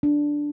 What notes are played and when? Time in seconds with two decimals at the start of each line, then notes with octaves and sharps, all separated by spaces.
0.03 D4